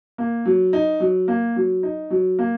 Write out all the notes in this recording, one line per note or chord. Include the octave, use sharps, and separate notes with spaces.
A#3
F#3
D#4
F#3
A#3
F#3
D#4
F#3
A#3